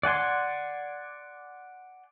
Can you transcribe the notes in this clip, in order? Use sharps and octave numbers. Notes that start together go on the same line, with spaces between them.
D5 F#5 G#5 C6